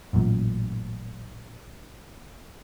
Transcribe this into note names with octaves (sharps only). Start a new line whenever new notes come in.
A1 F#2 A#2